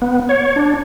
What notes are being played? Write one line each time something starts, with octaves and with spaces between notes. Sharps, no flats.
B3
C#5
D4